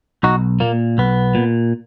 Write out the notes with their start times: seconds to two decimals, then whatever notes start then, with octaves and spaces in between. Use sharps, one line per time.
0.23 B1 D#4 F#4
0.60 A#2 A#3
0.98 B1 B3
1.35 A#2